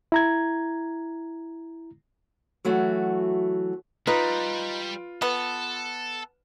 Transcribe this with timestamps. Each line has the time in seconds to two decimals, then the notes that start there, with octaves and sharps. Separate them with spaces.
0.12 E4 A#5 G#6
2.65 E3 F#3 A3 F#4
4.07 G3 D#4 F4 B4
5.22 B3 A4